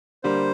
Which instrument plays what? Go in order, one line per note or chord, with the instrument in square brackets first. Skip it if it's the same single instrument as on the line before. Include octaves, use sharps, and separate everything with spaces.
[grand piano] D3 G3 A#3 [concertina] C5